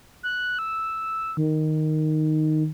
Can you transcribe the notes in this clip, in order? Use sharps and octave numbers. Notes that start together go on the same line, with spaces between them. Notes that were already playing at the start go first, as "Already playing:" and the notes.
F#6
E6
D#3